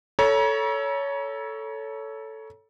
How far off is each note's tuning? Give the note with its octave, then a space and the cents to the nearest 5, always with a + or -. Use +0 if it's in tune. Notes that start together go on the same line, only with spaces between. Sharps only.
A4 +0 C#5 +15 A#5 +45